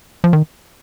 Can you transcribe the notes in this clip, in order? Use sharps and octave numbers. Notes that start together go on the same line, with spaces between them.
F3
D#3